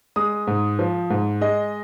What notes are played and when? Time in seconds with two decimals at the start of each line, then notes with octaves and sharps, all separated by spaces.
0.16 G#3 D#6
0.47 G#2
0.79 F3
1.10 G#2
1.41 G#3 D#5